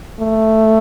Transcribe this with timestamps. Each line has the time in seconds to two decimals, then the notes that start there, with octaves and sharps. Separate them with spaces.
0.20 A3